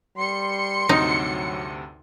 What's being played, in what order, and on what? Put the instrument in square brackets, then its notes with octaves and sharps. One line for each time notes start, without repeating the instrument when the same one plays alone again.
[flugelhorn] G3 [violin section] C6 C#7
[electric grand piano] D2 G2 C3 [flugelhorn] F#3 [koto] D#4